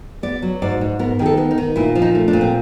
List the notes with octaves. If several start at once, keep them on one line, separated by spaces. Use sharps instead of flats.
B3 D5
F#3
G#2 D5
G#2
B3 A#4
D#3 G#4
A4
B3
D#4
D#3
A#2 E4
F3
D#4
A3
D4
A#2
C4